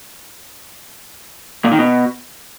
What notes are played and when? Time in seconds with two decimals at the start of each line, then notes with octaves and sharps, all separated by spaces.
1.65 A#2
1.72 D#3
1.79 B2